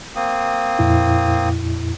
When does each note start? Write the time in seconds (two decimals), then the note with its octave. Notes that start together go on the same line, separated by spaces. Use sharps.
0.16 A#3 C4 D#6
0.79 F2 A#2 E4